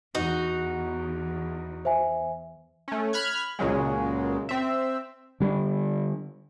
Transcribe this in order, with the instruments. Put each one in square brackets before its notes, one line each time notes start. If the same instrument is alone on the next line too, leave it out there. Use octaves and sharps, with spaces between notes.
[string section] E2 [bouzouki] D#4 F#4
[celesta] C5 E5 G#5
[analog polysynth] A3 C#4
B5 F6 F#6 G#6
C#2 A#2 C#3 F#3 G#3
C4 E5
[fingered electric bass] D3 G3 A#3 D4